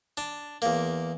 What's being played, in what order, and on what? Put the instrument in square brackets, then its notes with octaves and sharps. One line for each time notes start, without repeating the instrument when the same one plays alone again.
[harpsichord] D4
E2 A#3